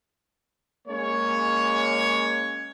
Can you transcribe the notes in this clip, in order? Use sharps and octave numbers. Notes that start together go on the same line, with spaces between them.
G#3 A#3 C#4 C#5